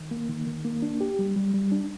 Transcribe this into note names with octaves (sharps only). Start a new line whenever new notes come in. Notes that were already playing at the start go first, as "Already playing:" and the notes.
Already playing: D#3
A#3
D#3
D#3
A#3
D4
G4
G3
G3
G3
D4